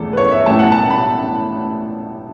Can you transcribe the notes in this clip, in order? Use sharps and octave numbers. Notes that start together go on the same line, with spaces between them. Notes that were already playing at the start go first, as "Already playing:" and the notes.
Already playing: E2 C#3 E3 A3 E4 A4
B4
C#5
E5
A1 A2 A3 E4 A5
F#5
A5
B5